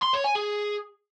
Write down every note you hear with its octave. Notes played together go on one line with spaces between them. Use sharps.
C6
C#5
G#5
G#4